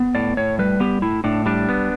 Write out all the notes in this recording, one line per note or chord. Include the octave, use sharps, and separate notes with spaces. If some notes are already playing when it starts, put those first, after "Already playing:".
Already playing: B3
A2 D5
A2 C#5
G3 B4
B3 G4
A2 E4
A2 D4
G3 D4
B3